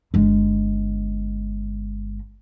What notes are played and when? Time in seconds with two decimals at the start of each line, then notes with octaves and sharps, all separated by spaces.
0.14 G1 G#3